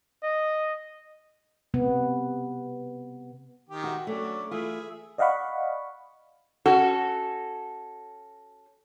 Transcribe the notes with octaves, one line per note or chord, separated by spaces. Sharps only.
D#5
C3 B3
D#3 G4
F#4 E5
F#3 A3 C#4 D4
E3 A3 F4 G#4 E5
D5 D#5 F5 F#5 B5 C#6
C#4 F#4 A4